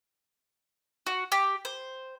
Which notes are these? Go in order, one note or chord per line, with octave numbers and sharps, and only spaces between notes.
F#4
G4
C5